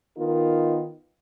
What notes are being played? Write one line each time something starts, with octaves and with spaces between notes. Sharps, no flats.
D#3 B3 D#4 F4 A#4